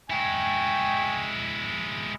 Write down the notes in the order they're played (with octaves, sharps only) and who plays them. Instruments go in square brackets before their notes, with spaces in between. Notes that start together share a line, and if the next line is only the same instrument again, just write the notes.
[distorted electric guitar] G#3 E4 [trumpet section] G5 G#5 C#6